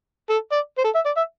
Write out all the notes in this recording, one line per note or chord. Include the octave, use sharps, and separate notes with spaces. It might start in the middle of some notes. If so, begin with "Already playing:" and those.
A4
D5
C5
A4
E5
D5
E5